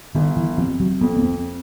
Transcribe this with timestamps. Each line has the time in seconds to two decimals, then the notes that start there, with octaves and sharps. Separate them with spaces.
0.15 G1 D#3
0.37 E3
0.57 C3 F3
0.80 F#3
1.01 F2 B3
1.16 B3
1.23 C4